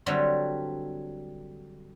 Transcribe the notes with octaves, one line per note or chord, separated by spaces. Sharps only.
D3 F#3 G3 A3 C4